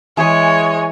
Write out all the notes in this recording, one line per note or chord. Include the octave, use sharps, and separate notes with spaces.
E3 G#3 G#4 C#5 G#5